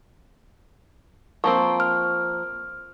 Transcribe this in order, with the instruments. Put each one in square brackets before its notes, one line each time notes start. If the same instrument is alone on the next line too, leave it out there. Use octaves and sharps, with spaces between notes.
[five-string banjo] F3 A#3 C4 [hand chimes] C#6
[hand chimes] F6